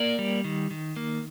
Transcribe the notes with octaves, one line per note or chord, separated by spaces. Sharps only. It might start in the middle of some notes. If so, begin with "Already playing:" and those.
Already playing: A#3 A#4 D5
G3
D#3
D#3
A#3